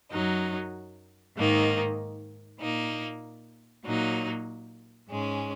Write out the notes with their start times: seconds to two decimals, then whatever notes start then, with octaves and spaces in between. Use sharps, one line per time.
0.11 F#2 F#3 D#4
1.36 G#2 D#3 A#3 D#4
2.59 A#2 A#3 D#4
3.84 A#2 F#3 A#3 D#4
5.08 G#2 G#3 C#4